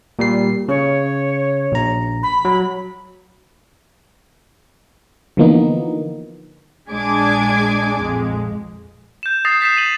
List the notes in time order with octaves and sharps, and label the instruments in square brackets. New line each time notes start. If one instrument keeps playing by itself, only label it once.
[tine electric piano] A#2 G3 C7
[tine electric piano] C#3 [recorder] C#5
[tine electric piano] A#1 A#5
[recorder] B5
[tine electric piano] F#3
[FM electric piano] D3 E3 F3 A#3 B3 D#4
[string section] A#1 G#3 D4 G#5 D6 G#6
A#1 F2 G#3
[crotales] G6 E7
D#6 G6 A6 A#6 C7 F7
G6 B6 C7 E7
D#7 F#7